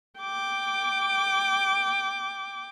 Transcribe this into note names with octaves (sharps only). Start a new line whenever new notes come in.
G5 D6